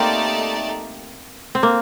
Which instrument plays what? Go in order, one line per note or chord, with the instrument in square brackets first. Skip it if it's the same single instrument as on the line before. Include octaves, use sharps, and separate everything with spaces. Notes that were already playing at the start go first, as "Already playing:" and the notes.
Already playing: [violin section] A3 D#4 G4 D5 A5 [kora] A#3 C4
[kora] C4
A#3